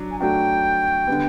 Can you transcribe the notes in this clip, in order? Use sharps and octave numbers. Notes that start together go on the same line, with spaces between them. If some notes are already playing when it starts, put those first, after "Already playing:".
Already playing: F#3 D4
G#5
F#3 A3 D4 F#4 G5
D3 G3 B3